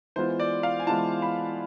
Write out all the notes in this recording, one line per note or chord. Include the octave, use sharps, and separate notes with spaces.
E3 G#3 B3 F4 C5
D5
F5
G#5
E3 G#3 B3 F4 A5
B5